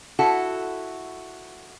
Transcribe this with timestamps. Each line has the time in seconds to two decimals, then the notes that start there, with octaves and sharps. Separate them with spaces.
0.19 E4 F#4 A4